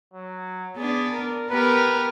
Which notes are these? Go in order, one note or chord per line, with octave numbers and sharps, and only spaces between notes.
F#3
B3 D4 G#4
A#4
B3 G4 A#4 B4